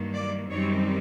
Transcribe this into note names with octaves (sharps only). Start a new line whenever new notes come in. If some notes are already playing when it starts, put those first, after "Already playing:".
Already playing: G2 D#3 F#3 A#3
D5
F#2 D#3 G3 C4 D#4 C#5